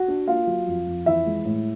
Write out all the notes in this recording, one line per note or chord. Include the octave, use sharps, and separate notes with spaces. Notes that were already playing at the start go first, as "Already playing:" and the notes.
Already playing: F#4 F#5
D4
A#3 F4 F5
F#3
F2
F2
E3 E4 E5
G#3
A2